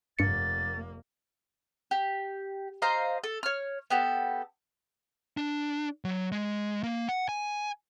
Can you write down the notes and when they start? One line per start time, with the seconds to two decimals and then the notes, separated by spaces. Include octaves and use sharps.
0.19 F1 G2 A#3 A6 C#7
1.91 G4
2.82 C5 D#5 F5 A#5
3.24 A4
3.43 C#5 F6
3.90 B3 G4 A4
5.37 D4
6.05 F#3
6.32 G#3
6.83 A#3
7.09 F#5
7.29 G#5